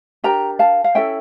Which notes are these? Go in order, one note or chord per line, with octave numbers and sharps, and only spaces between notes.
D4 G4 A#4 G5 A#5
F5 A5
F5
C#4 E4 A4 E5 G5